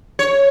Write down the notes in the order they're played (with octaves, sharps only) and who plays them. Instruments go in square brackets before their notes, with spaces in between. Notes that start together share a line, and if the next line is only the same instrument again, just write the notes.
[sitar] C#5